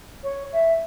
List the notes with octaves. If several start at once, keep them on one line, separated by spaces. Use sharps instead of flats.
C#5
E5